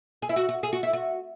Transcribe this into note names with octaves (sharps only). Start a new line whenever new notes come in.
G#4
E4
F#4
F#4
G#4
F#4
E4
F#4